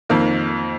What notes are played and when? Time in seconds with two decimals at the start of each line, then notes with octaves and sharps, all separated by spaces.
0.09 F2 D#3 A#3